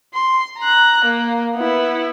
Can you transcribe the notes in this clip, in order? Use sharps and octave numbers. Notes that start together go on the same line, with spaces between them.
C6
A#5 F#6
A#3
B3 E4